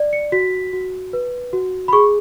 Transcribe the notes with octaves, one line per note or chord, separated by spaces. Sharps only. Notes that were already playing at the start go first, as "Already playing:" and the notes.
Already playing: D5
C#7
F#4 B6
F#4
B4
F#4
B5
G#4 C#6